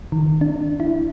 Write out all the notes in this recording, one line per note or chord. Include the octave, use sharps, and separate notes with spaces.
D#3
D4
E4